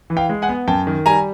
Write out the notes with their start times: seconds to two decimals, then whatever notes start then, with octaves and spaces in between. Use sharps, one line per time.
0.10 E3
0.17 F5 G5
0.29 G#3
0.42 F#5 G#5
0.49 B3
0.67 F#2 G5 A5
0.87 D#3
1.06 G3 G#5 A#5